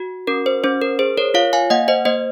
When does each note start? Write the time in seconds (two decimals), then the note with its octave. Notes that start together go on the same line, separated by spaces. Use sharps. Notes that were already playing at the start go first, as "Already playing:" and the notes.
Already playing: F#4
0.27 C#4 A#4
0.46 C5
0.64 C#4 C5
0.82 A#4
0.99 G#4 C5
1.17 A#4 C#5
1.34 F4 C#5 F5
1.53 F5 G#5
1.70 A#3 D#5 F#5
1.88 C5 D#5
2.05 A#3 C5 D#5